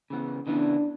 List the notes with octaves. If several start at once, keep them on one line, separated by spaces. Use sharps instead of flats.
C#3 E3 B3
C#3 E3 B3 D4